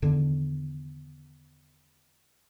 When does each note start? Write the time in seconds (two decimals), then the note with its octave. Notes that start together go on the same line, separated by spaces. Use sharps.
0.02 E2 D3 D#3